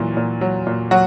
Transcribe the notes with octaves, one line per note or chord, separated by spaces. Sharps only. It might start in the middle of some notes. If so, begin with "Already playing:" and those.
Already playing: A#2 E3 F#3
A#2
F#3
A#2
F#3 F#4